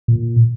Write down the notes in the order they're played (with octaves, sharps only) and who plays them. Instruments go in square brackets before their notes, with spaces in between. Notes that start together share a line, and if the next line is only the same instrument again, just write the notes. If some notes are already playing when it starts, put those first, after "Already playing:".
[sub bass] A#2